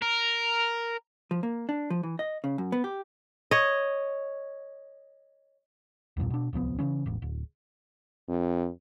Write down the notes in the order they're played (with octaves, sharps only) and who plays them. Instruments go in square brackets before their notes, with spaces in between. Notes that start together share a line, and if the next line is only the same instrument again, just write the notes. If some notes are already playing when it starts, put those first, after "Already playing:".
[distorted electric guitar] A#4
[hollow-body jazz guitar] F3
A#3
D4
F3
E3
D#5
C#3
F#2
B3
G4
[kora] C#5 D#5
[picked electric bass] B1 E2 G2 A#2
B2 D4
D1 C2 F3 B3
C#3 E3 F#3 C#4
E1 A1
D1
[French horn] F2